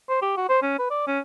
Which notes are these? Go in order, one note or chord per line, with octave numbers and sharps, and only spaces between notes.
C5
G4
F#4
C5
C#4
B4
D5
C#4